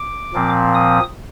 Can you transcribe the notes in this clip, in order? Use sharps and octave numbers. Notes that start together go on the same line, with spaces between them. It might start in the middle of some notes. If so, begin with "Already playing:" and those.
Already playing: D6
A#2 F3 C4
D#6